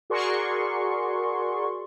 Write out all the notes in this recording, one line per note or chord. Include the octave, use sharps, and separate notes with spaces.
F#4 G#4 A#4 D5 C6 C#6